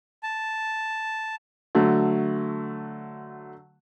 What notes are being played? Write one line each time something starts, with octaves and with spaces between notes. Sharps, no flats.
A5
D3 F#3 A3